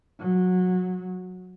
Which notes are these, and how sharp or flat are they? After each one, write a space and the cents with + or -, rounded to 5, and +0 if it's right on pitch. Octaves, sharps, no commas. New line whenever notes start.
F#3 -20